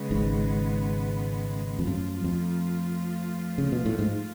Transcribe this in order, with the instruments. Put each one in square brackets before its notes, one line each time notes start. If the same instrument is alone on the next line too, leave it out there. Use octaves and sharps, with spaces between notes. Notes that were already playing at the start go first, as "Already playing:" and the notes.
Already playing: [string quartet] C#3 G#3 B3
[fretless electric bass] G#1 G#2
F2
[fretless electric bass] F#2 [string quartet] F3 A3 F4
[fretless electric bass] F2
C#3
B2
A2
G#2